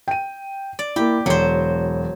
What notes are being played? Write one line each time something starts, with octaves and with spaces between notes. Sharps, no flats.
G5 D#7
D5
A#3 E4 G4
E1 F#3 C5